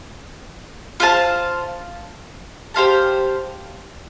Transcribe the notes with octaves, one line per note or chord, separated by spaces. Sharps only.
F4 C5 F5 A5
G4 C5 F5 A5